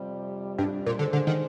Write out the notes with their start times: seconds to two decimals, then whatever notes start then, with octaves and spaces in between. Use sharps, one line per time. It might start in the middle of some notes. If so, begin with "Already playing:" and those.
Already playing: F2 C3 G3
0.58 G2
0.86 A#2
0.99 D3 G#3 D4 G#4 C5
1.13 D3
1.27 D#3